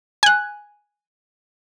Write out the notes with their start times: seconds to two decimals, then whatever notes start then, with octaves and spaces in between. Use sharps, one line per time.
0.23 G#5 F#6